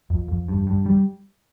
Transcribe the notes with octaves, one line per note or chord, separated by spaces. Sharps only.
F2
F2
G2
G2
G3